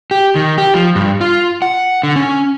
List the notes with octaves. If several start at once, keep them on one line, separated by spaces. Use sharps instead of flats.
G4
D#3
G4
F3
G2
F4
F#5
D3
C#4